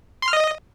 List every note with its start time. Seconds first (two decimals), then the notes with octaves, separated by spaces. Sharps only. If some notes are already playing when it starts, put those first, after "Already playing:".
0.22 C6
0.28 F6
0.33 D#5